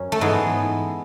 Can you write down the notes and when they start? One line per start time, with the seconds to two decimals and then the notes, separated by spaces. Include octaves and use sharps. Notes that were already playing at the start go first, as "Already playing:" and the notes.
Already playing: F#2 C#4
0.12 A3
0.21 G#2 E3 G#3 B3